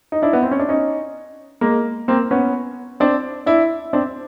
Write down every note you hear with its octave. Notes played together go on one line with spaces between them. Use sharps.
D#4
D4 E4
B3
C4
C#4
D4
C#4 D#4
G#3 A#3
A#3 C4
B3 C#4
C4 D4
D4 E4
C4 D4